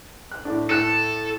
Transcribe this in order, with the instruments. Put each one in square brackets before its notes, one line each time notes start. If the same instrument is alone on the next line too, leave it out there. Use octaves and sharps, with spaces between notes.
[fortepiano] F#6
A2 D4
[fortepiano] A2 F#6 [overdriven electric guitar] A4